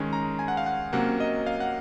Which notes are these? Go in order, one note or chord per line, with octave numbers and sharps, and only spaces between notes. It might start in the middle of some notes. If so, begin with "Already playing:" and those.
Already playing: D#3 G#3 C#4
A#5
G#5
F#5
F5
F#5
C3 F#3 A#3 C#4 F#5
D#5
F5
F#5